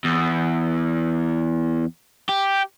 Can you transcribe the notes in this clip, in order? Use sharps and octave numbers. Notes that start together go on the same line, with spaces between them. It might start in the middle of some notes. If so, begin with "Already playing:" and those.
E2
G4